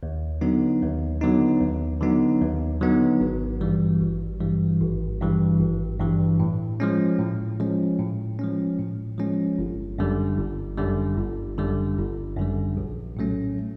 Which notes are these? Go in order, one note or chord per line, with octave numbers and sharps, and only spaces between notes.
D#2
D3 F#3 B3 D#4
D#2
D3 F#3 B3 D#4
D#2
D3 F#3 B3 D#4
D#2
D3 F#3 B3 D#4
G#1
G2 E3 G3
G#1
G2 E3 G3
G#1
G2 E3 G3
G#1
G2 E3 G3
A2
F3 G#3 C#4
A2
F3 G#3 C#4
A2
F3 G#3 C#4
A2
F3 G#3 C#4
G1
F#2 D3 G3
G1
F#2 D3 G3
G1
F#2 D3 G3
G1
F#2 D3 G3
A#1
A2 F#3 A3 C#4